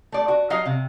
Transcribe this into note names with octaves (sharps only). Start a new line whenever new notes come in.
A3 D5
F#4
F#3 D#5 F5
C3